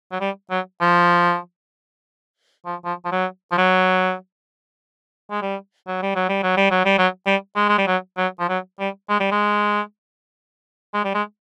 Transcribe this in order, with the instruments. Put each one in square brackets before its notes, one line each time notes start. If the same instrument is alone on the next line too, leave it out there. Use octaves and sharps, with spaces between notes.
[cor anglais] F#3
G3
F#3
F3
F3
F3
F3
F#3
F3
F#3
G#3
G3
F#3
G3
F#3
G3
F#3
G3
F#3
G3
F#3
G3
G#3
G#3
G3
F#3
F#3
F3
F#3
G3
G#3
G3
G#3
G#3
G3
G#3